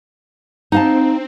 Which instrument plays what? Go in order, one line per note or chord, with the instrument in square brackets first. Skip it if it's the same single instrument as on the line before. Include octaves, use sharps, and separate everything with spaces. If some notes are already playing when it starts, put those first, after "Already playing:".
[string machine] C4 [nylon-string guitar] D#4 F5 A5